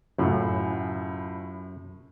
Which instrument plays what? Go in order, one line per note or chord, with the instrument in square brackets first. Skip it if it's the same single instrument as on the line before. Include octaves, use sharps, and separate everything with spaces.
[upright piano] C#2 A2 [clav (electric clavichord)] F#2